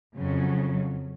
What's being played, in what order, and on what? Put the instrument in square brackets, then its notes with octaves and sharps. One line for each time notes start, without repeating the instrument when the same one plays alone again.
[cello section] F2 C#3 F#3